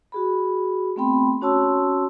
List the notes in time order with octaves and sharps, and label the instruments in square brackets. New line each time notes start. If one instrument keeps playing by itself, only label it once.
[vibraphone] F#4 G#4 B5
A3 B3 C4 G5 B5 C6
C#4 F#4 C#5 A5 C6 E6